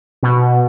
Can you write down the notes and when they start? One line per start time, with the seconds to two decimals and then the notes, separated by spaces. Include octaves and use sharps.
0.23 B2